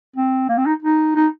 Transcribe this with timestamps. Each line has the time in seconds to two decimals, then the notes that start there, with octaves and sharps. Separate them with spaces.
0.16 C4
0.49 A#3
0.57 C4
0.66 D#4
0.82 D#4
1.15 D#4